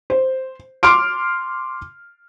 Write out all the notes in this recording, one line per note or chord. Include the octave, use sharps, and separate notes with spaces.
C5
C6 D6 F6 D7